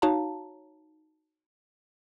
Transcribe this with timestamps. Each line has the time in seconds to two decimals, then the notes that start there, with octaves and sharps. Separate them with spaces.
0.02 D#4 F#4 C#5 F5 A5 A#5